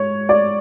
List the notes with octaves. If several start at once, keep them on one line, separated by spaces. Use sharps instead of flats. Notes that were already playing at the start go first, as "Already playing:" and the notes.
Already playing: G#2 C#5
D5